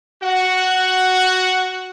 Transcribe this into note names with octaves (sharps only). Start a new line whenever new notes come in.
F#4 F#5